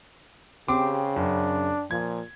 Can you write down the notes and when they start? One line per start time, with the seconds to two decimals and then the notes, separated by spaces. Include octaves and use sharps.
0.68 C#3 C4 G4 D6
1.16 F#2 D4
1.91 A#2 F3 G#6